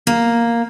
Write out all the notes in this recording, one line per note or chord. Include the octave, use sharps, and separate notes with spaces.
A#3